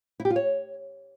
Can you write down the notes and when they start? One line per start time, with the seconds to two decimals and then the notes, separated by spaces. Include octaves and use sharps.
0.20 E4
0.25 G4
0.30 F4
0.36 C#5